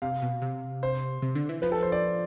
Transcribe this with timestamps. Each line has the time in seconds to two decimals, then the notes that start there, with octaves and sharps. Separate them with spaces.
0.02 C3 F5
0.22 B2
0.42 C3
0.83 C5
1.22 C3
1.35 D3
1.49 E3
1.62 F3 B4
1.72 A4
1.83 C5
1.92 D5